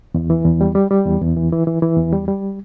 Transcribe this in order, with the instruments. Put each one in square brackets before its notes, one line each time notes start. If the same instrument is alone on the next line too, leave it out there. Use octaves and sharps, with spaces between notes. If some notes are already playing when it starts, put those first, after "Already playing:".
[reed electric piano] E2
E3
E2
G3
G3
G3
E2
E2
E3
E3
E3
E3
E2
G3
G3